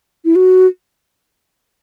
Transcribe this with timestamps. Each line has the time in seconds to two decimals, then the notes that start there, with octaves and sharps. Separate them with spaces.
0.25 E4
0.35 F#4